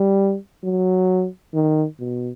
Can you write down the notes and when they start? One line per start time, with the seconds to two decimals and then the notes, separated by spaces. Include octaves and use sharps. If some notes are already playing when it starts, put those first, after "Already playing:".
Already playing: G3
0.64 F#3
1.54 D#3
1.99 B2